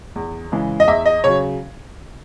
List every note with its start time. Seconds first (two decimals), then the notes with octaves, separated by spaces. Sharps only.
0.16 E2
0.52 C#3 E3 G#3
0.80 D#5
0.88 E2 E5
1.06 D#5
1.24 C#3 F#3 C#5